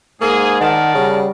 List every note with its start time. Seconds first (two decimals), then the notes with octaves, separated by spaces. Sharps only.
0.21 G#2 A#3 G#4
0.61 D#3 A#4 D5 F#5 A5
0.95 C#3 G3